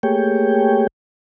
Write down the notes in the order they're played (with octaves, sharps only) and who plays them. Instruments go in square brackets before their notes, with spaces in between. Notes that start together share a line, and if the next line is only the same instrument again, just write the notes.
[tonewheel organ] A3 A#3 G4 G#4 C#5 G5